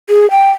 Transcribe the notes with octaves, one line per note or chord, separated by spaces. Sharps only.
G#4
G5